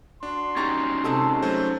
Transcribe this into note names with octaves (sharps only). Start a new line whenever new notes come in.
D4 F#4 C6
C#4 D#4 G4 A#5 C#6 A6
C3 G#3 A4
F#3 A3 C5